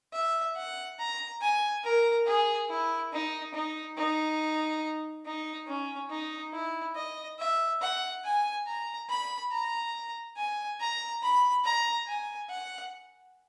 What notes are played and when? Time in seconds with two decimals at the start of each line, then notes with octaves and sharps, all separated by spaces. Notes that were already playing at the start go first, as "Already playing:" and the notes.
0.12 E5
0.56 F#5
0.99 A#5
1.41 G#5
1.84 A#4
2.26 G#4
2.69 E4
3.12 D#4
3.54 D#4
3.97 D#4
5.25 D#4
5.67 C#4
6.10 D#4
6.53 E4
6.96 D#5
7.39 E5
7.81 F#5
8.24 G#5
8.67 A#5
9.09 B5
9.51 A#5
10.36 G#5
10.80 A#5
11.23 B5
11.65 A#5
12.07 G#5
12.50 F#5